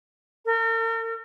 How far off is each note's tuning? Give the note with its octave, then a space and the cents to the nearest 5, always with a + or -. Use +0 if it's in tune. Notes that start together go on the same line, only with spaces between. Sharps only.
A#4 -45